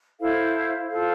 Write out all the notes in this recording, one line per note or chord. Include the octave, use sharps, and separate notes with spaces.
E4 A4 C5 F5
F4 A4 C5 F5